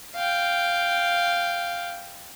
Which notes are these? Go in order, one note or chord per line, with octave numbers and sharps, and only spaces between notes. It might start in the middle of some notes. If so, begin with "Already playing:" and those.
F5 G5